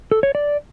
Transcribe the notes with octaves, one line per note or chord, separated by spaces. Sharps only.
A4
C#5
D5